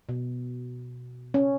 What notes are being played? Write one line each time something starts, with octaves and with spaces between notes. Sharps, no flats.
B2
C#4